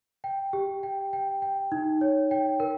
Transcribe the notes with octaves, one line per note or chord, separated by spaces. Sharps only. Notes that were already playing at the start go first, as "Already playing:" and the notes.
G5
G4
G5
G5
G5
D#4
C#5
G5
A#4